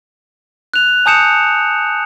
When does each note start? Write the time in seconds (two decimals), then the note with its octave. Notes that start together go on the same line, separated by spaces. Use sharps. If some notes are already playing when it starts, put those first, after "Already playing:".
0.74 F#6 F7
1.06 G#5 A5 D#6 G6 C#7 E7